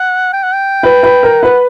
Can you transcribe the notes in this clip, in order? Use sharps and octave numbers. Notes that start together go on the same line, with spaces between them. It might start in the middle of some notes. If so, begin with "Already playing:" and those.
Already playing: F#5
G5
F#5
G5
B4
B4
A#4
B4 F#5